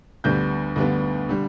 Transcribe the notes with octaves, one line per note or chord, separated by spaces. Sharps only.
D2 D3 G3 B3 G6
D2 D3 G3 B3
D3 G3